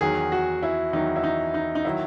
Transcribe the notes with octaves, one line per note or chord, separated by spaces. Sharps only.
E2 D#3 F#3 G#4
F#4
E4
E2 D#3 F#3 D#4
E4
D#4
D#4
D#4
D#3 F#3 E4